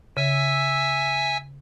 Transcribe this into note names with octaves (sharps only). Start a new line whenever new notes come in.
C#3 E5 G#5 E6